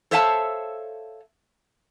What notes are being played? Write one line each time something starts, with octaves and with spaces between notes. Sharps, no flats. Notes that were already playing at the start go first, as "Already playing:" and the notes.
A4 C5 C#5 E5 F5 A5